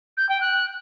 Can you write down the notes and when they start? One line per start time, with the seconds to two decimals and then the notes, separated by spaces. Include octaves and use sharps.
0.17 G6
0.28 G5
0.40 F#6